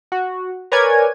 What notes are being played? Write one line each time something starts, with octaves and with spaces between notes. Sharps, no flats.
F#4
A#4 B4 C#5 D5 G#5 G#6